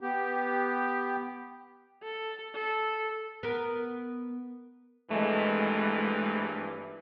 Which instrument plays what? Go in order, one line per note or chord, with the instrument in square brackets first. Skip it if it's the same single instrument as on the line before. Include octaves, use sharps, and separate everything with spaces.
[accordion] B3 G4
[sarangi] A4
A4
[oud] B3 A#4
[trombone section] G#1 G2 E3 [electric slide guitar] G#3 A3